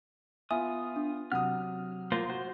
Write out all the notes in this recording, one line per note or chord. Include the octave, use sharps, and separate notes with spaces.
B3 F4 E5 G#5 D#6
D4
C3 F#3 F#5 D#6 F6
A#3 F4 C5
F#4 C5